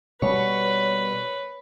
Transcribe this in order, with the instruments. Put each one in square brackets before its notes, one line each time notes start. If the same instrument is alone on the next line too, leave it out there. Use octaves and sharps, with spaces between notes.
[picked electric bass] B2 G3 [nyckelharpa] B4 [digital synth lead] C#5